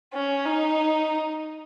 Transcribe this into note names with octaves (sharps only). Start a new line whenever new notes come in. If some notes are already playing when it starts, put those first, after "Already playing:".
C#4
D#4